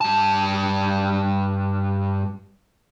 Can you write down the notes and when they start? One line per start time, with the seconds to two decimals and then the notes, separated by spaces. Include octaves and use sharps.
0.01 G2 A5